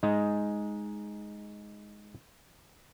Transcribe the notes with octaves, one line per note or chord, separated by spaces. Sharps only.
G#3 D#4